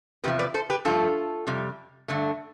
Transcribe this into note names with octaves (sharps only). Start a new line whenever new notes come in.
E2 C3 F3 G4 B4
B4 D5
A4 C5
G4 B4
G2 F3 A3 F4 A4
F2 C3 G3
G2 D3 A3